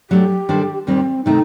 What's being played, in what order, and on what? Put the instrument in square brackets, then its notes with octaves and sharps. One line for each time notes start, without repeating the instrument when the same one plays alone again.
[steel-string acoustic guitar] F#3 A3 D4 [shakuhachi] G4
[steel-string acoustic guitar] D#3 G3 D4 A4 C5
[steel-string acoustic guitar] D#2 D#3 G3 [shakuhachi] C4
[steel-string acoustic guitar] C3 D#3 A3 C4 [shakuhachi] D#4